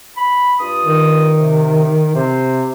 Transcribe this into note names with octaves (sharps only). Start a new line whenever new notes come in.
B5
G2 F4 D#6
D#3
C3
C3 C5